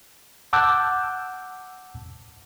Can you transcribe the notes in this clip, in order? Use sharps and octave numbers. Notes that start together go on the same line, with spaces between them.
F#5 A5 D6 E6 F#6 G6